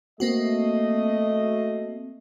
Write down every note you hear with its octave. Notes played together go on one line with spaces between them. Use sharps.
A3 A#3 C4 F#4 D#5